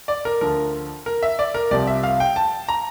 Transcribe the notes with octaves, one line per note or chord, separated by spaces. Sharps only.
D5
A#4
D2 D3 F3 A#4
A#4
E5
D5
A#4
C2 C3 F3 D5
E5
F5
G5
A5
A#5